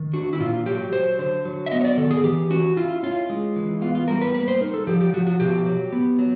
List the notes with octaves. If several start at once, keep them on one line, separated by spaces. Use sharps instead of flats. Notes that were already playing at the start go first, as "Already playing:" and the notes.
Already playing: D#3
D4 F#4
E4
A#2 F4
F#3 G4
F#3 C5
D3 C5
F#3
E5
B3 D#5
C#5
D5
D#3 A4
G#4
E3 G4
C#4 F#4
E4 F4
C#4 F4
G#3
E3
B3 F4
F4
G3 A#4
B4
A#3 B4
C5
D#4 A#4
A4
F3 G4
G4
F3 F#4
F#4
B2 G4
F#3
B3
F#3